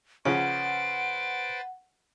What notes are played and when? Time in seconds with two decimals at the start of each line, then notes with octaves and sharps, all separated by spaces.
0.25 C#3 F3 C#4 B4 C5 F#5 A6 D7